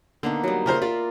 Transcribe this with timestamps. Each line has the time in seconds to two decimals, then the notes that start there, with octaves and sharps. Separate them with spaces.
0.23 D3 A#3 B3 D#4
0.44 F#3 G3
0.66 C#3 F4 A#4 C5 E5
0.82 F4 A#4 D5